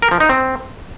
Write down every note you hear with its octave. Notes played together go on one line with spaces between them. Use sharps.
A#4
F3
D#4
C4